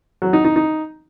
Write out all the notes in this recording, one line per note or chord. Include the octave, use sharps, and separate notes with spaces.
F#3
D#4
D#4
D#4